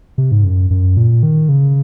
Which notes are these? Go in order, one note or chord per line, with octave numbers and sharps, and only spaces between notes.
C3
G#2
F#2
F#2
A#2
D#3
C#3